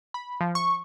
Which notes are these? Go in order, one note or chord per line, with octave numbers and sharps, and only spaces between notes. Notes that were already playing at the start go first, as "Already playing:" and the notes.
B5
F3
C#6